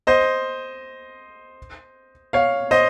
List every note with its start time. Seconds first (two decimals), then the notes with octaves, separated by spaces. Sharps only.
0.07 C5 D#5
2.33 C#5 F5
2.71 C5 D#5